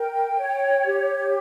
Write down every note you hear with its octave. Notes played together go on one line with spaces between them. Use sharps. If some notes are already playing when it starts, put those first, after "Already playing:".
Already playing: A#4 G5
C#5
G4